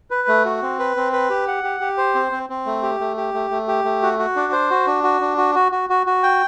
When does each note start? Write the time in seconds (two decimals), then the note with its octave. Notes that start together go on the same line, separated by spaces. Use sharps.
0.11 B4
0.28 A3
0.45 F#4
0.62 C4
0.79 B4
0.97 C4
1.13 B4
1.30 G4
1.48 F#5
1.64 G4
1.81 G4
1.98 C5
2.15 C4
2.32 C4
2.49 C4
2.66 A3
2.82 G4
3.00 A3
3.17 G4
3.34 A3
3.51 A3
3.68 G4
3.84 A3
4.03 F#4
4.19 F#4
4.36 D4
4.52 C5
4.70 F#4
4.87 D4
5.03 F#4
5.21 D4
5.37 F#4
5.55 F#4
5.72 F#4
5.90 F#4
6.07 F#4
6.23 G5